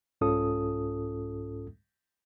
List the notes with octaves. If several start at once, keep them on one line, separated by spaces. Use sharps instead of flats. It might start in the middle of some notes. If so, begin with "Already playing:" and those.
C2 G#2 C#4 F4 A4 D#6